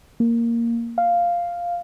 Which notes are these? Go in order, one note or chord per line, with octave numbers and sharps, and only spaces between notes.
A#3
F5